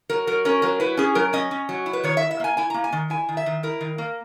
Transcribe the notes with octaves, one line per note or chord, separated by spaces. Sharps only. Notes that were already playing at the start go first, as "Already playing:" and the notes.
F#3 A#4
F#3 A#4
C#4 A#4
F#3 A#4
E4 B4
C#4 G#4
F#3 A#4
C#4 D#5
C#4
F#3
E4
B4
D#3 C#5
E5
E4
E5
A#3 G#5
E4 G#5
A#3 A#5
G#5
D#3
E4 G#5
D#3
E5
D#3
E4 A#4
D#3
A#3